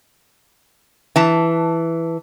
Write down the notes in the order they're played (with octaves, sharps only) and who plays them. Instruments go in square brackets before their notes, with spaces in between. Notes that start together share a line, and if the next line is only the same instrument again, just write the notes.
[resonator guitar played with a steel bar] E3 A5